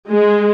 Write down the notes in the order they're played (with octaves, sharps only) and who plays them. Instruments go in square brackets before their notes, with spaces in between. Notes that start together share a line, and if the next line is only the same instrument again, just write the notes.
[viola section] G#3